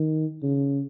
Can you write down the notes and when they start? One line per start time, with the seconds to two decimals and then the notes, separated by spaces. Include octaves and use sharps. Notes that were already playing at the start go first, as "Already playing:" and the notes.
Already playing: D#3
0.43 C#3